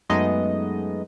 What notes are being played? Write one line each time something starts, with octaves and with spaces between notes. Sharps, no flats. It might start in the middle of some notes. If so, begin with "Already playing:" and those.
F#2 G#3 A3 B3 D#4 D#5